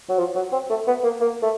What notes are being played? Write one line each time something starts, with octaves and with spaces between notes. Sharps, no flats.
F#3
F3
F#3
C4
A3
B3
A#3
A#3
A3